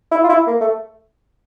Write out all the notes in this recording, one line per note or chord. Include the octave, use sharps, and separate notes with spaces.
E4
F4
E4
A#3
A3